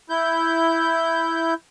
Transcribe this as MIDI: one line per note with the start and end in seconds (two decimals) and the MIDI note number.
0.09 1.54 64
0.09 1.54 91